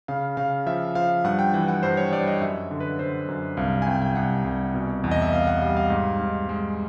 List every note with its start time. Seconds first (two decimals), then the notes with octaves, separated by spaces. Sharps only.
0.08 C#3 F5
0.37 C#3 F5
0.66 F3 E5
0.95 F3 F5
1.24 G2 F#5
1.39 G5
1.54 E3 F#5
1.68 F#5
1.83 G2 C5
1.97 C#5
2.12 G2 D5
2.27 D#5
2.41 F#2 E5
2.71 D3
2.80 B4
2.99 D3 C5
3.28 F#2
3.57 C2 F5
3.82 G#5
3.86 C2 G5
4.02 G5
4.15 C2 F#5
4.45 C2
4.74 B2
5.04 E2
5.11 D#5
5.22 E5
5.32 E2 F5
5.47 F#5
5.62 G3 F5
5.77 F5
5.90 G#2
6.20 G#2
6.49 G#3